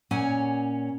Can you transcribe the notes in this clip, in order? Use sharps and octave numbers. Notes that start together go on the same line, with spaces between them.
A#2 C#4 C#5 F#5 G#5